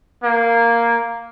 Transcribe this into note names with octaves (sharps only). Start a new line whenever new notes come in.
A#3